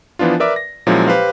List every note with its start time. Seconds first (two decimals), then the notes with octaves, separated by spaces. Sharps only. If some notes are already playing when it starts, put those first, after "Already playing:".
0.19 E3 F3 B3 D4 F4
0.40 A#4 B4 D5 E5 D6
0.56 A#6
0.87 A#2 F3 F#3 G#3 C#4 E4
1.08 G4 B4 C5 F5